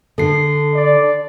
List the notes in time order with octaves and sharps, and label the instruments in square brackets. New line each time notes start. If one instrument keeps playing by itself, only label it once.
[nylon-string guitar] D3 [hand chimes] A4 C7
[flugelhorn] D5